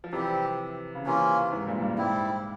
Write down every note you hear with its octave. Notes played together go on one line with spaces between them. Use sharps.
F3
C3 E3 G3 C4 G4
C#3
C3 E3 A#3 C#4 F4
G#2 C3
G2 A#2
G2
G#2 G3 C4 E4